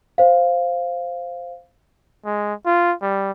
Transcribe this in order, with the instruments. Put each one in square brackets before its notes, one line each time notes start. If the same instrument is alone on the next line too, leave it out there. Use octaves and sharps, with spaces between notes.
[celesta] C5 F5
[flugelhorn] G#3
F4
G3